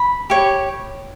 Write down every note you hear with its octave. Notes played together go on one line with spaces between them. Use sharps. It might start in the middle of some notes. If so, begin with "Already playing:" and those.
Already playing: B5
G4 C#5